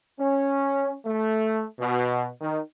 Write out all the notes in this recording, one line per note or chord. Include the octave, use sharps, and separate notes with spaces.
C#4
A3
B2
D#3